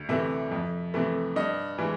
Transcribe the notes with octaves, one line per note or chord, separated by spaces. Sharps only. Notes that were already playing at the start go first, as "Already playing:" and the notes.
Already playing: D2
C3 E3 A3 E5
F2
C3 E3 A3
G2 D#5
E3 G#3